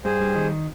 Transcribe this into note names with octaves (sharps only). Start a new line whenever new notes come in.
G2 G#4 C5
G3
D#3